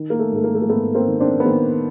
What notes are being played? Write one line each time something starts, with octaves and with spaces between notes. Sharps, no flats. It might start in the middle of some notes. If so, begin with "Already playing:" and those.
Already playing: D#3
A#3
A3
G#2 A3
A#3
A3
A#3
G#2 A3 B3
A#3 C4
D#3
C4 D4
B3
D#3 A#3 C4